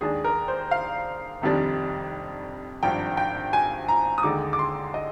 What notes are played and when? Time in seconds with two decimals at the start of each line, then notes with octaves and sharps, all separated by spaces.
0.01 D#2 D#3 G#3 D4 G#4
0.24 A#4
0.48 C5
0.71 F5
1.42 F1 F2 D#3 G3 D4
2.83 G#1 G2 F3 G5
3.17 G5
3.53 G#5
3.88 A#5
4.18 D#6
4.23 D#2 D3 G#3 D#4 D6
4.53 D6
4.59 C6
4.94 D#5